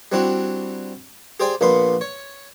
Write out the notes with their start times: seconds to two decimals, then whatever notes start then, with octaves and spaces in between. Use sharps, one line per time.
0.12 G3 C4 D4 E4 F#4 G4
1.40 G4 G#4 C5 D5 G5 G#5
1.61 A#1 A#2 B3 B5 C6
2.01 C#5